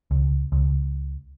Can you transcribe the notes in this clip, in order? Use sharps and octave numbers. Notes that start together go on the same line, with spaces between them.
C#2
C#2